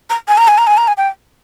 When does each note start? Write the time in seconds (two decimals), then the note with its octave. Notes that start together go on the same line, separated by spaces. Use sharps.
0.10 A#5
0.28 G#5
0.38 A#5
0.48 G#5
0.58 A#5
0.67 G#5
0.77 A#5
0.88 G#5
0.98 G5